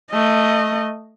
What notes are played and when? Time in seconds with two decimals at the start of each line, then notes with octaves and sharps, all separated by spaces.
0.12 A3 D#5